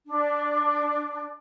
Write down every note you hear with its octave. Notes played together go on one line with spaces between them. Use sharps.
D4